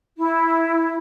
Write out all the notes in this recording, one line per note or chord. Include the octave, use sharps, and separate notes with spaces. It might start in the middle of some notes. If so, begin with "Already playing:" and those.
E4